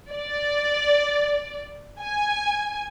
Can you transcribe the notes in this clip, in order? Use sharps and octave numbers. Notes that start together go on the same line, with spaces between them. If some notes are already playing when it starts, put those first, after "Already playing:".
D5
G#5